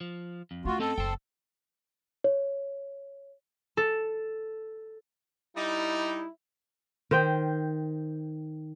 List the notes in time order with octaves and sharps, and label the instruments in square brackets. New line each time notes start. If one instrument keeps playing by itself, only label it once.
[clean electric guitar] F3
F2
[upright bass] A3 C#4 [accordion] F4 F#4
[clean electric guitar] C4 D#5 G5 [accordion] A4
[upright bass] F#1 [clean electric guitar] C5 G5
[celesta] C#5
[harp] A4
[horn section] G3 D#4 [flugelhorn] E4
[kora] D#3 C5 G5